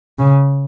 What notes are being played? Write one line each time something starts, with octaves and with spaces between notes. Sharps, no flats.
C#3